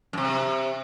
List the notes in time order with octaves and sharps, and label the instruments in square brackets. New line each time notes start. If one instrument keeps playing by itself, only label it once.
[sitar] F#2 C3